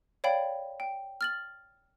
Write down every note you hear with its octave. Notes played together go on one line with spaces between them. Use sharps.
C#5 D5 F5 G5 B5
G5
F6 A6 F#7